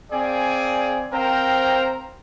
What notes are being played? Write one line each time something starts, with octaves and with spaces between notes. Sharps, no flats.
C4 G#4 D5 F5 G#5
C4 A#4 C5 F5 G5 A#5